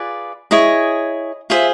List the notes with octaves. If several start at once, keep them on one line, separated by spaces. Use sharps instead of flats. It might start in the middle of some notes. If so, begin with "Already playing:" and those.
Already playing: F4 G#4 B4 D5
E4 G#4 C#5 D#5
F4 G#4 C5 E5